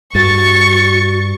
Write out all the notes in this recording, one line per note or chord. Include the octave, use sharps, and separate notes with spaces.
G2 F#4 C#6 A6